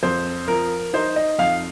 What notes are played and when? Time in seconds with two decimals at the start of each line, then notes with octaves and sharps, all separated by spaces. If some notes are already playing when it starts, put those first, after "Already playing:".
0.03 F2 C5
0.48 F3 A#4
0.93 D#4 C5
1.16 D#5
1.39 F2 F5